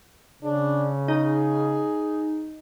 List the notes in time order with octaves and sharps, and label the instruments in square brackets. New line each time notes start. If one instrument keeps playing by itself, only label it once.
[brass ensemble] C#3 [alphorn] D4
[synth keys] D#4 [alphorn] G#4